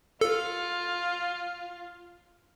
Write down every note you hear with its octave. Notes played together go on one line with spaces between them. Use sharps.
F4 A4